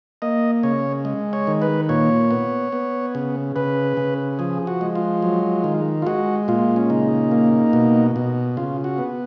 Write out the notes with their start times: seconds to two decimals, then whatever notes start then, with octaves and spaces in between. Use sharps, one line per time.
0.22 A#3 D#5
0.63 C#3 C#5
1.05 G#3
1.33 C#5
1.47 D#3
1.62 B4
1.89 A#2 C#5
2.31 B3
2.73 B3
3.15 C#3
3.56 C#3 B4
3.97 C#3
4.39 F3 G#4
4.67 F#4
4.81 G#3
4.95 F4
5.22 F#3
5.64 D#3
6.02 F4
6.06 G#3 F#4
6.48 A#2 F4
6.76 C#4
6.90 C#3 D#4
7.32 A#3
7.73 B2
8.16 B2
8.57 C#3 F4
8.84 F#4
8.98 B3